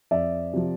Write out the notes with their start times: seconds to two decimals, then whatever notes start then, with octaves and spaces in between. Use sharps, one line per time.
0.11 F2 D5 E5
0.53 C3 F3